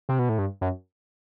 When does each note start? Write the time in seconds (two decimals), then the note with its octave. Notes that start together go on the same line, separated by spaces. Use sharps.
0.09 C3
0.19 B2
0.29 A2
0.38 G2
0.61 F#2